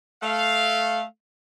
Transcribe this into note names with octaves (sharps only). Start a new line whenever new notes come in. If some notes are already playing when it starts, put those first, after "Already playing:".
A3 F5